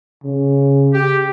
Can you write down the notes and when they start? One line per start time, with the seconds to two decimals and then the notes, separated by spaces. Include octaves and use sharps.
0.24 C#3
0.94 G4